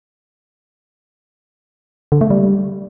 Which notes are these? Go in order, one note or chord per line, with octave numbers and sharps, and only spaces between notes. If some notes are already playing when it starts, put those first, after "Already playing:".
D3
A3
G3